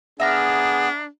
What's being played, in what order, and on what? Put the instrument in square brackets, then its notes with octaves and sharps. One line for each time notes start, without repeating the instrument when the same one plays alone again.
[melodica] B3 [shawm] D4 [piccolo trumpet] G#4 [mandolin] E5 A#5 F6